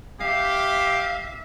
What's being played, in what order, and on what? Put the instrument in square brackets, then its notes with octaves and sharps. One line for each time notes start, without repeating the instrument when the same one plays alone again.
[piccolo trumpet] G4 [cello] E5 [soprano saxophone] F5